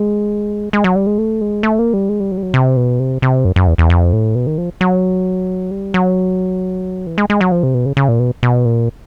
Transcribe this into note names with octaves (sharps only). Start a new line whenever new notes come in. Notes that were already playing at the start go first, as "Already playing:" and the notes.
Already playing: G#3
G#3
F#3
G3
G#3
A3
G#3
A3
A#3
G3
G#3
G3
F#3
G3
F#3
C3
B2
C3
C3
F#2
F#2
E2
E2
F2
A2
B2
D#3
F3
F#3
G3
F#3
E3
G#3
G#3
F#3
F3
C3
B2
C#3
C#3
A#2
B2
B2
A#2